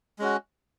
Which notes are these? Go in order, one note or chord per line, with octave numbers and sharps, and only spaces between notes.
G#3 C#4 F#4